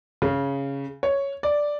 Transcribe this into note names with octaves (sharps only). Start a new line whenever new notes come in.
C#3
C#5
D5